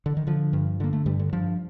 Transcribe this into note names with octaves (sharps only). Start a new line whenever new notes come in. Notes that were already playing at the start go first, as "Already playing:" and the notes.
D3
D#3
D3 F3
G2
D3 A#3
A3
G2 G3
D3
G2 F3